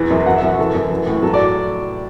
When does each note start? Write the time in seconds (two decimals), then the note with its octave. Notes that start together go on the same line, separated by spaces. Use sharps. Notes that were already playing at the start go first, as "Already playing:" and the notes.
Already playing: E2 E3
0.11 F#2
0.26 F#3 F#5
0.37 E5
0.42 F#2
0.48 F#4
0.59 E3 A4
0.75 F#2
0.90 E3
1.06 A2
1.22 F#3 A4
1.34 D5